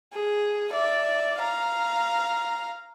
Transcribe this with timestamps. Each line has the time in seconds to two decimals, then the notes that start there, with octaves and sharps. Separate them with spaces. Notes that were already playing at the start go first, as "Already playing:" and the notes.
0.13 G#4
0.71 D5 E5
1.39 F5 A#5